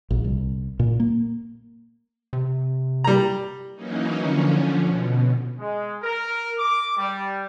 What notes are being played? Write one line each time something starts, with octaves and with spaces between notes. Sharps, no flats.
A#1
C2
A#2
A#3
C3
G3 A#5
E3 F#3 A#3 C#4 D#4
D3 F3 C#4
B2
G#3
A#4
D6
G3